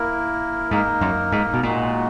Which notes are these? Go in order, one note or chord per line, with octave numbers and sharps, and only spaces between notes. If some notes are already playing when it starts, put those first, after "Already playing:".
Already playing: A#3 E4 A#4
G#2 A#3 D#4 A#4
F#2
G#2
B2
A#2 G#3 D#4 F#4